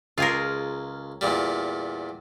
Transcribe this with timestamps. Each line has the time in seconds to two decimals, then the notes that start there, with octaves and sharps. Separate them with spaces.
0.18 C#2 F4 G#4 A#4
1.21 E2 A#2 G3